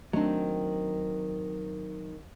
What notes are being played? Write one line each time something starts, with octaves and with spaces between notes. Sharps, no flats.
D#3 F#3 A3 C4 D4